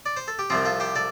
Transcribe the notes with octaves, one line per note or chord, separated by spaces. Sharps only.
D5
C5
A4
G4
C2 C3 F3 C4 F4
F4 A4
G4 C5
A4 D5